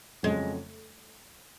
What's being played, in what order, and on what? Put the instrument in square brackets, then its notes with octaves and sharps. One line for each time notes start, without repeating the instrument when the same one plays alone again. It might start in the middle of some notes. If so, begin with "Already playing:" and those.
[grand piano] F2 C#3 F#3 [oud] G#3